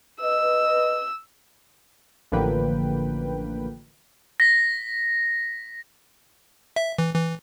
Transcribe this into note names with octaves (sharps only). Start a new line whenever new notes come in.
B4 D#5 E6
A1 D3 F3 A#3 B4 G5
A#6 B6
E5
E3
E3